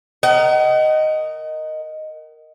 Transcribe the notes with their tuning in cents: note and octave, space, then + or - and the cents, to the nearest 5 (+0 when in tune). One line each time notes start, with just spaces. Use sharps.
A#4 +0 D#5 +0 F#5 +40